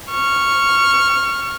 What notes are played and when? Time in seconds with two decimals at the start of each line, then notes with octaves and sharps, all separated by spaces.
0.10 C#6 F6